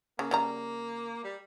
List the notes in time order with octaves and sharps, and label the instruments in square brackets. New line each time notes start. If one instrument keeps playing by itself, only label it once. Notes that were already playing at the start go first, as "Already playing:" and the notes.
[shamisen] C#3 [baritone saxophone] A#3
[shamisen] C#3 G3 A#5
[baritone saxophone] G3